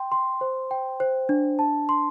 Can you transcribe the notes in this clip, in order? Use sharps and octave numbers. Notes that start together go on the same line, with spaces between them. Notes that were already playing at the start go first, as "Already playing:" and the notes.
Already playing: G5 C6
C6
C5
G5
C5
D4
A5
C6